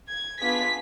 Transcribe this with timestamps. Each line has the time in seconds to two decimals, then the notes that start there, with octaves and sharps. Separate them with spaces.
0.09 G#6
0.40 B3 D4 F4 G#4 B6